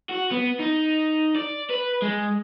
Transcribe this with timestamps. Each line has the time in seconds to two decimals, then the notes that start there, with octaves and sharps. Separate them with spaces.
0.09 F#4
0.31 B3
0.59 D#4
1.36 D5
1.70 B4
2.02 G#3